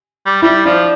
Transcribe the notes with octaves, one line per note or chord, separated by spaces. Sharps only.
G3
G3 E4
F3 D4